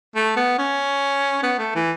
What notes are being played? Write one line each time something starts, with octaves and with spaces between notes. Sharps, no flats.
A3
B3
C#4
B3
A3
E3